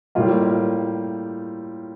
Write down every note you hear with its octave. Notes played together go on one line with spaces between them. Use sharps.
A2 G3 A#3 F4